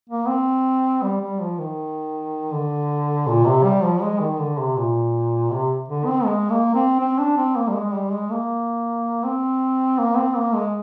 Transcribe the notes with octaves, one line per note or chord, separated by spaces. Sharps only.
A#3
C4
G3
G3
F3
D#3
D3
A#2
C3
G3
F3
G#3
D#3
D3
C3
A#2
C3
D3
C4
G#3
A#3
C4
C4
D4
C4
A#3
G3
G#3
G3
G#3
A#3
C4
A#3
C4
A#3
G#3